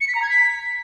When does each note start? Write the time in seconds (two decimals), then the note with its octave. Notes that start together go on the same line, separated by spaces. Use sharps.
0.01 C#7
0.08 B6
0.15 A#5
0.22 G#6
0.29 B6